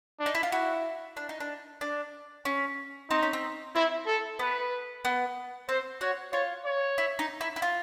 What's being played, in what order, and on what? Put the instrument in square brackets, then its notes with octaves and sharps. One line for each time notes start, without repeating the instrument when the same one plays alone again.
[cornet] D4
[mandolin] D#4
E4
F4
[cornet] E4 [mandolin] F#4
[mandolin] D4
D#4
D4
D4
C#4
[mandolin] C4 [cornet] D#4
[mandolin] C#4
C4
[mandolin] C4 [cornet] E4
[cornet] A4
[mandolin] B3 [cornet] B4
[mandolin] B3
[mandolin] C4 [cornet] C5
[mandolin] F#4 [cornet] C#5
[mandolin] F4 [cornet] C#5
[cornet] C#5
[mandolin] E4
D#4
E4
E4
F4